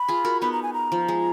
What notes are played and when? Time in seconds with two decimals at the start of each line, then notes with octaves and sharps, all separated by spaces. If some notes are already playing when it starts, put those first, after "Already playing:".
Already playing: B5
0.08 F4 G#4
0.25 F#4 A#4
0.42 B3 D#4 B5
0.52 A#5
0.63 G#5
0.74 A#5
0.92 F3
1.08 G#3